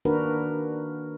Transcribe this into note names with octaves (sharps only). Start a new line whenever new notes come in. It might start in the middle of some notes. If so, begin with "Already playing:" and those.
D#3 A#3 D4 F#4 A#4 B4